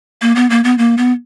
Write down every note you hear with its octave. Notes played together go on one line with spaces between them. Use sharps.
A#3
B3
A#3
B3
A#3
B3